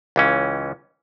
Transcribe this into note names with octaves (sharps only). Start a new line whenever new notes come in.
C#2 E3 C#4